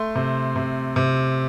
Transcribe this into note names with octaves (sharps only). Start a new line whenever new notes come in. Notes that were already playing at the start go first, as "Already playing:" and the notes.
Already playing: A3 C6
C3
C3
C3